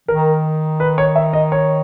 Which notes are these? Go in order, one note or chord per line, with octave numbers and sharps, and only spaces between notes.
D#3 A#4
B4
C#5
E5
D#5
C#5